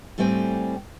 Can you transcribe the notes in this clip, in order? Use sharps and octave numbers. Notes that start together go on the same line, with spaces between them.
A2 G3 A3 C4 G5 G#5